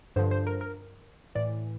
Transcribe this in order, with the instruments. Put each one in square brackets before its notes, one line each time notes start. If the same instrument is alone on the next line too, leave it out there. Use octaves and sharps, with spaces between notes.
[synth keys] G2 D3 F3 C5
C5
A#4
A#4
A2 E3 D5